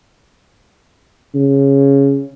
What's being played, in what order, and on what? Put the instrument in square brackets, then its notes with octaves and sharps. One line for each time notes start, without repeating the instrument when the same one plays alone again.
[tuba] C#3